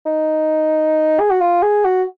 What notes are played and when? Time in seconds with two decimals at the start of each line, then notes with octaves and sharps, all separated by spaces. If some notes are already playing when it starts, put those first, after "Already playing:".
0.06 D#4
1.20 G#4
1.30 F#4
1.40 F4
1.62 G#4
1.85 F#4